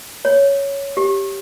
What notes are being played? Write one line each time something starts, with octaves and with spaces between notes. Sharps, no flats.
C#5
G4